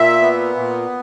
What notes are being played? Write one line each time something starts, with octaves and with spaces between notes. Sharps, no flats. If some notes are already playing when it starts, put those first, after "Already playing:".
Already playing: A#2 E5
B3
A#2